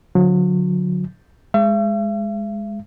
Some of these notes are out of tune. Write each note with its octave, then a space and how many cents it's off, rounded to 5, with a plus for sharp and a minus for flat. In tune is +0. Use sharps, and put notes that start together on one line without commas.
D3 -20 F#3 -35
G#3 +0 E5 +45